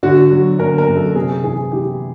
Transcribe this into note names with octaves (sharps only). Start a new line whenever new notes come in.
D3 F#4
F#3
D3 A#4
A#4
F#2
A4
C3 G#4
E3 G#4
E3 G4